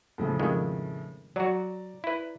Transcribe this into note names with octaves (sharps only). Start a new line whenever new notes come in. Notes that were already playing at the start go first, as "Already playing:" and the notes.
A2 C#3 F3
F2 D#3 G#3
F#3 F#4 D5 A#5
E4 B4